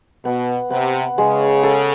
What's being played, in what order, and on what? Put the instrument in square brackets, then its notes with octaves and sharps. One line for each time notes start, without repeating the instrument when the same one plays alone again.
[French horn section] B2 [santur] B3
[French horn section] C3 [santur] B3
[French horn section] C#3 [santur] G#3
[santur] A4